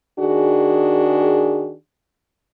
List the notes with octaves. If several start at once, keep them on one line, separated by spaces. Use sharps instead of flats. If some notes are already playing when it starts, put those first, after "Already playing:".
D#3 D4 F#4 G#4